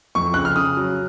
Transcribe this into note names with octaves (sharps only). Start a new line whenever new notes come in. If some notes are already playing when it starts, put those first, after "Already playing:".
F2 C#6
C#3 F#6
F6
C#3 D#6
F#3